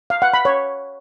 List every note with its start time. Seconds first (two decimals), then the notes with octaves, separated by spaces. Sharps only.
0.10 F5
0.22 F#5
0.34 B5
0.45 C#5